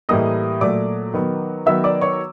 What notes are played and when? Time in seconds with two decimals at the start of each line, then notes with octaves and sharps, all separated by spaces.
0.09 A2 E3 G3 A#3 D#5 D#6
0.61 A#2 F#3 A3 D5 D6
1.14 D#3 F#3 B3
1.66 D#3 F#3 B3 E5 E6
1.84 D5 D6
2.01 C#5 C#6